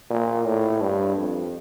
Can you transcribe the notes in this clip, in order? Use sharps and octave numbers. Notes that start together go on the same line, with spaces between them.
A#2
A2
G2
F2